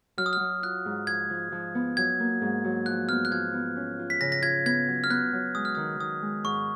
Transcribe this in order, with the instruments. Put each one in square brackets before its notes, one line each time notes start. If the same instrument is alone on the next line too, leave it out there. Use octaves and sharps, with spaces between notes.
[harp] F#3 [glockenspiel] F6
[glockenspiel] D#6
F6
[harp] F#3
[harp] F4 [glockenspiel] F#6
[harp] G#2
[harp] F3 [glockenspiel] G#6
[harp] F3
F3
B3
[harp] F#3 [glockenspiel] G#6
[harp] A#3
G#2
F#3
[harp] F3 [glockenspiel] F#6
[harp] B3 [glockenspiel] F6
[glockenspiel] F#6
[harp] F3 [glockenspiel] G#6
[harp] B3
C#4
F4
[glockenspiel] B6
[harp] C#3 [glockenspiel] A#6
[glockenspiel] A#6
[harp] F4 [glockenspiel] G#6
[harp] B3 [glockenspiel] G#6
[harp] F#3
[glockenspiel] F6
[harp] B3 [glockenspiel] F#6
[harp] F#3
[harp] G#3 [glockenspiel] D#6
[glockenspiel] F6
[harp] D#3 [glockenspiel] D#6
[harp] D#3 [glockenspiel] D#6
[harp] G#3
[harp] G#2 [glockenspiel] C#6